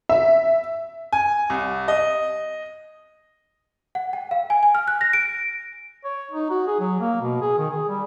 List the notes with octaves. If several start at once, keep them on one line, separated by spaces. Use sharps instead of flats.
E5
G#5
C2
D#5
F#5
G5
F5
G#5
G#5
F6
F#6
A#6
D7
C#5
D#4
F#4
G#4
F#3
A#3
B2
G#4
D#3
G#4
G3